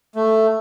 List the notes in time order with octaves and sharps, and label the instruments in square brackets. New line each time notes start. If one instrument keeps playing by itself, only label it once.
[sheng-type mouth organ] A3